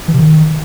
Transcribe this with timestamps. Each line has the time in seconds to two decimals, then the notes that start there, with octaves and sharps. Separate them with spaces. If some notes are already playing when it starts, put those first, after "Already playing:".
0.08 E3
0.14 C3
0.20 D#3